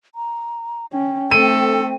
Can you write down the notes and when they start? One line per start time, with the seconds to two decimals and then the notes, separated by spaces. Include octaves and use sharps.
0.15 A#5
0.93 C#4 G5
1.31 A3 C4 A4 D#7